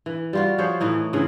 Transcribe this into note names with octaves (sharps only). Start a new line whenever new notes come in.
E3
G3 F4 F#4
F3 G#4 C5 C#5
A2 E3 D#4
G#2 C#3 E3 G#4